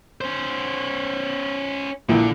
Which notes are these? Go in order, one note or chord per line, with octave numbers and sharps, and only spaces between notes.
C#4 C5
A#1 D3 E3